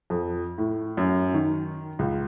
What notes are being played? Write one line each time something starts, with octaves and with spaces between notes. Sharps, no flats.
F2
A2
F#2
D#3
C#2